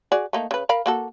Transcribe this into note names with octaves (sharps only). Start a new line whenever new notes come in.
F#4 G#4 D5
A3 A#3 D#4
C#3 B4
A#4 F5 B5
A#3 F#4 A4